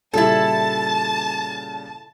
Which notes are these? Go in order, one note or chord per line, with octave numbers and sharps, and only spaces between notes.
A#2 C#3 G3 E4 A4 A5